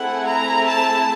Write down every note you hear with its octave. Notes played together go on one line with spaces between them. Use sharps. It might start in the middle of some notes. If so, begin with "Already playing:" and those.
Already playing: A3 C4 E4 G#4 F#5
A#5
A5